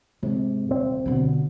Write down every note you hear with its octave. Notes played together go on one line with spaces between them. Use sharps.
G#2 C3
D#1 C4
B2 D3